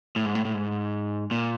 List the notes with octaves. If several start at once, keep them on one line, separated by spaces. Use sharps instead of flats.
A2
G#2
A2
A2
G#2
A#2